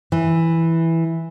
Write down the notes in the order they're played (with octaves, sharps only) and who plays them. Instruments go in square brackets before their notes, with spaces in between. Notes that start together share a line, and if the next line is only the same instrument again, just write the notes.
[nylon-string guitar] E3